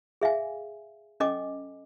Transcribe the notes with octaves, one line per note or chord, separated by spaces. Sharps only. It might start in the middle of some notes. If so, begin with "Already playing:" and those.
G#4 E5 F5 G#5
C#4 A4 D#5 G#5 D6